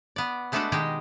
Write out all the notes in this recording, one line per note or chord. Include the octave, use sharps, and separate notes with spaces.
B3 D5
G#3 A3 B3 D4 F#4 A4
B2 D#3 G#3 G4 D#5 G5